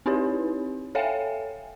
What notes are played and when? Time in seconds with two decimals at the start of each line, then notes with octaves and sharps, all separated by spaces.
0.06 C4 D#4 E4 G4 B4 C#5
0.95 A4 C#5 E5 F5 G5 G#5